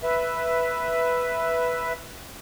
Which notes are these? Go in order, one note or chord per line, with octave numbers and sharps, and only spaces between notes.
B4 E5